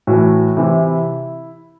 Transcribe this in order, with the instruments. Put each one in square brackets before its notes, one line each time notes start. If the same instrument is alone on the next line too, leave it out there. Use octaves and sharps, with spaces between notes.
[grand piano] A2 E3 F#4
C3 E3 E4